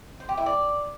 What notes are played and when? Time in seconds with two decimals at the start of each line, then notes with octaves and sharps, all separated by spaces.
0.20 C5
0.29 G4
0.37 E4
0.46 D5